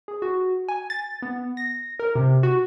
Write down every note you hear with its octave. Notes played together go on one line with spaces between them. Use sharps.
G#4
F#4
G#5
A6
B3
A#6
A#4
C3
F#4